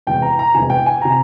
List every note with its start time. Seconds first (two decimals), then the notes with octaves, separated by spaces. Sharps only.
0.07 E1 E2 C3 G5
0.22 A#5
0.39 A#5
0.54 E1 E2 C3 G#5
0.70 G5
0.86 G#5
1.02 C3 A#5